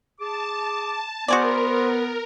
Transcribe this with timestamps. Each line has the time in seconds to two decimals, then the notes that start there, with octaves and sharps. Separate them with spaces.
0.19 G#4 A5 D6
1.28 B3 F#4 G#4 A#4 C5 D5